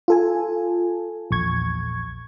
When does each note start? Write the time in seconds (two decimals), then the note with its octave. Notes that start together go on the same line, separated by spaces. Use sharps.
0.08 F4 A4 G#5
1.31 A#1 E2 C#6 G#6